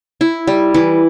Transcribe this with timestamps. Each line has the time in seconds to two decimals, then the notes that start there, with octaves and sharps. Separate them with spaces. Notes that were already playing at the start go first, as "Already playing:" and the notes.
0.21 E4
0.47 G3
0.74 E3